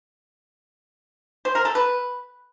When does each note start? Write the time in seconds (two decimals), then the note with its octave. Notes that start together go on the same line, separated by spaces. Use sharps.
1.45 C5
1.55 A#4
1.65 A4
1.75 B4